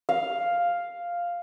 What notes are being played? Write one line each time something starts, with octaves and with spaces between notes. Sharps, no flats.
F5